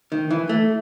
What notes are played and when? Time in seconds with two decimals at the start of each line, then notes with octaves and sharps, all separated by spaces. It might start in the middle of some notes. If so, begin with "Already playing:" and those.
0.12 D#3
0.31 E3
0.49 A3